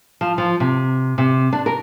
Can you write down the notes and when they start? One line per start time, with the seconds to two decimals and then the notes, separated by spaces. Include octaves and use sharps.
0.21 F3
0.38 F3
0.60 C3
1.18 C3
1.53 D4
1.66 A#4